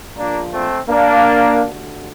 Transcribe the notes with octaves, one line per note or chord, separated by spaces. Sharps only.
A#1 A#2 F3 A#3 D4
A3 C4
A#3 D4
D2 D3 G3